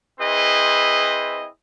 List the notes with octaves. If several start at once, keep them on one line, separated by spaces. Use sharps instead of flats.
C4 E4 G#4 B4 C5 D#5